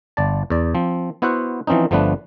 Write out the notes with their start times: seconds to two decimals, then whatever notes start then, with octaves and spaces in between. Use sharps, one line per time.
0.17 G1 D5 A5
0.50 E2 D5
0.75 F3 C4
1.22 B3 E4 F#4 C5 E5 F#5
1.67 E3 F3 C4 C#4 D#4
1.91 G1 F3 A3 B3 D4 B4